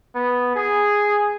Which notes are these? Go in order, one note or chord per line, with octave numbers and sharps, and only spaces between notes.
B3
G#4